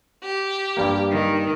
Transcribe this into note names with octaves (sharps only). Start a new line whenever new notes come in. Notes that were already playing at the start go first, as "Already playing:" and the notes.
G4
G2 G3 A#3
D#3